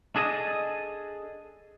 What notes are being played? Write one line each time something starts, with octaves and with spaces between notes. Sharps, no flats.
D4 G#4 A4 D#5